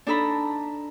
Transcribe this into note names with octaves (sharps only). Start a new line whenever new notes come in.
D4 D#4 A4 A#5 B5